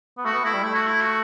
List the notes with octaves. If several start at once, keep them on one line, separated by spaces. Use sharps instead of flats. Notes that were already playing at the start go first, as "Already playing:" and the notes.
B3
A3 F#4
B3
A3 E4
G3
A3 E4
F#4
E4
F#4